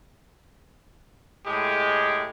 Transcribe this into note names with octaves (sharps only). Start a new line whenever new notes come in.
A2 G#3 G4